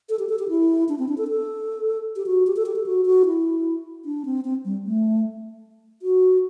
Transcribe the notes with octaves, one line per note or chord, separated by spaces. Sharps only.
A4
G4
A4
G4
E4
D4
C4
D4
A4
A4
G4
F#4
G4
A4
G4
A4
F#4
F#4
E4
D4
C4
C4
G3
A3
F#4